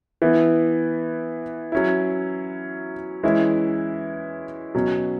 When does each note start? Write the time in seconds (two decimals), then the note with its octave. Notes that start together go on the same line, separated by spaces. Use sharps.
0.22 E3 B3 E4
1.72 F#3 C#4 E4
3.23 E3 G#3 C#4 E4
4.75 B2 F#3 C#4